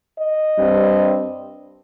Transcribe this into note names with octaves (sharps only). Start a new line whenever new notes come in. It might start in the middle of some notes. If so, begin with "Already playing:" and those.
D#5
G2 G3 C4